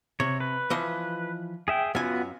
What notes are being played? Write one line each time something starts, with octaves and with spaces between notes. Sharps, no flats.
C3 C#5
B4
E3 F3 D#5
G#4 E5 G5
F#2 B3 F4 F#4 G#5